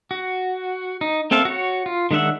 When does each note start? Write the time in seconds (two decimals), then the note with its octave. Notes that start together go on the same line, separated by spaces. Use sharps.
0.11 F#4
1.01 D#4
1.31 A#3 C4 A4 E5 F5
1.45 F#4 C#5
1.86 F4
2.11 D#3 G#3 D4 E5 F#5